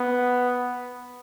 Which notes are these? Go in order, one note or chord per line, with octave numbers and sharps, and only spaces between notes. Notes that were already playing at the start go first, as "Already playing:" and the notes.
Already playing: B3